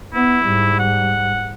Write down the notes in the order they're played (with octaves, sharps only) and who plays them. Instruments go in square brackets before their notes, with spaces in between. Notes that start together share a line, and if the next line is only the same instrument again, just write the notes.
[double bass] B3 [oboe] E4
[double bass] G#2 G3
[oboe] F#5